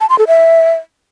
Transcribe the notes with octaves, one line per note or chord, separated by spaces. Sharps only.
A5
C6
A4
E5